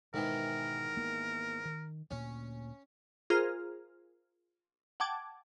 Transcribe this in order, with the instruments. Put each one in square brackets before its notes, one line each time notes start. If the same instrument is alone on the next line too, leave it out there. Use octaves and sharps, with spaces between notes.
[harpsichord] G#2 D#3 E3 [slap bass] B2 [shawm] A#4
[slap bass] A#3 B3
D#3
[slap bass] D2 A#2 [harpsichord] C#4
[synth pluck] F4 G#4 A#4 C5 A#5 F6
F#5 G5 A5 D6 G#6